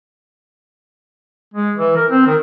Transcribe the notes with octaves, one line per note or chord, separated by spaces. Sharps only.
G#3
E3
A#4
C4
D#3